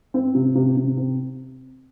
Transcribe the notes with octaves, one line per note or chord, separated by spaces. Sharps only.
C4
C3
C3
C3
C4